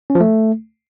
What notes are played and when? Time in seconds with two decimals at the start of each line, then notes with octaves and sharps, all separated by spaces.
0.10 C#4
0.15 F3
0.20 A3